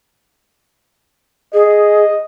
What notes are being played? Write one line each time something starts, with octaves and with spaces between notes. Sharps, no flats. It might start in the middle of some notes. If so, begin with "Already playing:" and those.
G#4 D#5